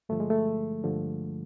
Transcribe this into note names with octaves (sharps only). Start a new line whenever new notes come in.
G2 D3 F3 A3
G#3
A3
G2 D3 F3